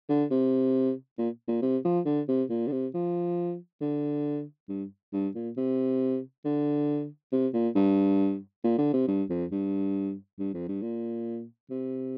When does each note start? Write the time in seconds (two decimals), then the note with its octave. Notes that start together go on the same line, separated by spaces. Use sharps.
0.09 D3
0.31 C3
1.19 A#2
1.48 A#2
1.62 C3
1.85 F3
2.06 D3
2.28 C3
2.50 A#2
2.68 D3
2.72 C3
2.94 F3
3.81 D3
4.69 G2
5.13 G2
5.35 A#2
5.57 C3
6.45 D3
7.32 C3
7.53 A#2
7.76 G2
8.64 A#2
8.78 D3
8.93 C3
9.08 G2
9.30 F2
9.52 G2
10.39 G2
10.54 F2
10.69 G2
10.82 A#2
11.70 C3